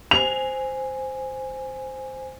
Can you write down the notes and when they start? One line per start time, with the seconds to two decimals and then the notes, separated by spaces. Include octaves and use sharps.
0.11 C5 G#5 F7